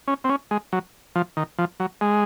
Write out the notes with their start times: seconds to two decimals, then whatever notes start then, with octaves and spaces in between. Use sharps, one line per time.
0.08 C#4
0.24 C4
0.29 C#4
0.51 G#3
0.73 F#3
1.15 F3
1.37 D#3
1.59 F3
1.80 F#3
2.01 G#3